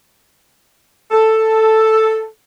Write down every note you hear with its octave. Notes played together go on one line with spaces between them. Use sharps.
A4